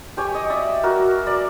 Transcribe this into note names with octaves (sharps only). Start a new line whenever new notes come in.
G4 C#5 G#5
D#5
D5 E5
F#4 A#4
D5